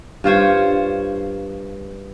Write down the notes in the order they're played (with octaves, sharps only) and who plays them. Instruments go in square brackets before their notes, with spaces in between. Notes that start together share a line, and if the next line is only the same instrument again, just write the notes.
[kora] G2 F4 C5 C#5